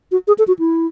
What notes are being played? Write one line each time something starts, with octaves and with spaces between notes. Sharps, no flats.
F#4
G#4
A4
F#4
E4